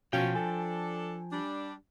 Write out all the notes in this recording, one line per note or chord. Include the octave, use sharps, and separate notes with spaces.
F#2 B2 F3 C#4 F#4 F5 G5
D4 A4 G#5
G3 D4